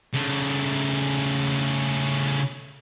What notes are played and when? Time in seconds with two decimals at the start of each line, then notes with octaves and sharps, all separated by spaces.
0.14 C#3 A3